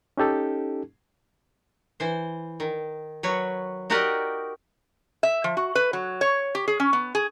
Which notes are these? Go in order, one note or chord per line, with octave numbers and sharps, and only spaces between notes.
C#4 D#4 G4 A4
E3 C5
D#3
F#3 B4 C#5
D#4 F#4 G4 A#4 D5 D#5
E5
F3
F#4
B4
F#3
C#5
G4
G#4
C#4
B3
G#4